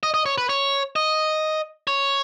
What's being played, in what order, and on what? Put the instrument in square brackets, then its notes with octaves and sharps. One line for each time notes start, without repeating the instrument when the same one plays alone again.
[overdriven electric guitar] D#5
D#5
C#5
B4
C#5
D#5
C#5